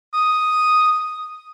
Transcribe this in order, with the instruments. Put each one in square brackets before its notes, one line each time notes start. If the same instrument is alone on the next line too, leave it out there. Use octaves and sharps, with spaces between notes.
[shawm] D#6